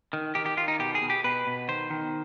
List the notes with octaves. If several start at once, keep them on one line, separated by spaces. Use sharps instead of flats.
D#3
D#3 G4
G4
D#3 F4
D#4
B2 G4
G#4
B2
G4
B2 B4
B2
D#3 C5
D#3